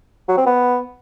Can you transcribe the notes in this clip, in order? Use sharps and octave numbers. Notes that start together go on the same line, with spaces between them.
F#3
C4
B3